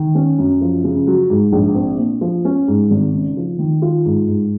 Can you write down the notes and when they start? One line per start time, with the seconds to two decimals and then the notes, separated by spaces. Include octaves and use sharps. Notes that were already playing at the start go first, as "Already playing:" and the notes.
Already playing: D#3
0.15 C#4
0.38 F#2
0.61 F3
0.84 C#3
1.07 F#3
1.30 G#2
1.52 A#1
1.75 C4
1.99 A#2
2.21 F3
2.45 C#4
2.68 G#2
2.91 G#1
3.14 C#3
3.37 F3
3.59 D#3
3.82 F4
4.05 G#2
4.28 G#2